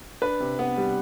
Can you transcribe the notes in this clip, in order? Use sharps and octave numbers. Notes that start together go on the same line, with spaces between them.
D4 B4
C3
B3
G3